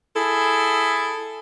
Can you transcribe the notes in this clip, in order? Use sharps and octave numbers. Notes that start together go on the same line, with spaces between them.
E4 G#4 A4